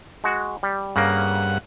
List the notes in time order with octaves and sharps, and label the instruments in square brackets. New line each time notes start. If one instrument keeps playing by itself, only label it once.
[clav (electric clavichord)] G#3 F#4
G3
[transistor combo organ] G2 F#5 [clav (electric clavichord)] C#3 A#3